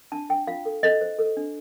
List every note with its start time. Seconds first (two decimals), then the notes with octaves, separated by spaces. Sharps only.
0.12 D4 A5
0.29 D4 G5
0.47 F4 F5
0.65 A4
0.83 A4 D#5
1.01 C5
1.19 A4
1.37 D4